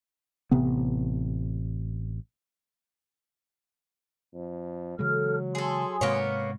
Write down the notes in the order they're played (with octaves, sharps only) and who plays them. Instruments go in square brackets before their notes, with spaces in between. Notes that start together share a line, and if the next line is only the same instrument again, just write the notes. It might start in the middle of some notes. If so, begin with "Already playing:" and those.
[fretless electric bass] A1 C3 B3
[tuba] F2
[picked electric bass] C#3 E3 G#3 [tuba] F#3 [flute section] A4 F6
[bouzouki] G#4 A4 [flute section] G#5 C6 D#6
[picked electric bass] G#2 C3 G#3 [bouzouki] A#3 B3 C#5